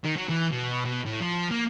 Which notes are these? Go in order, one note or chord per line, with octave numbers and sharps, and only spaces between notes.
D#3
F#3
E3
B2
B2
A2
F3
A#3